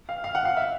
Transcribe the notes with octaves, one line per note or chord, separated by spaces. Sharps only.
F5
F5
F#5
F5
E5